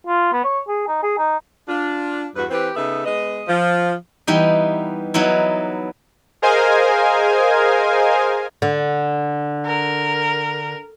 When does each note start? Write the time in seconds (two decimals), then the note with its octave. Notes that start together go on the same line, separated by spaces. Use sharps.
0.07 F4
0.33 B3
0.44 C#5
0.68 G#4
0.88 D#4
1.03 G#4
1.18 D#4
1.69 D4 F4
2.35 E2 G2 F#4 B4
2.50 E3 C4 G4 B4
2.75 C#3 B3 D#4 A4 E5
3.04 G#3 B3 D#5
3.47 F3
4.27 E3 G3 B3 D#4
5.14 F#3 B3 D#4 E4
6.42 G#4 A#4 C5 D#5 F5 G#5
8.62 D3
9.66 A#4